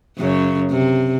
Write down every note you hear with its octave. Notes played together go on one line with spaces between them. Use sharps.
F#2 C#3
C3